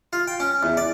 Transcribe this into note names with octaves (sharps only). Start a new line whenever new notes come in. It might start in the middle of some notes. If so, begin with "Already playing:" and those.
F4
G5
C#4
E2
D5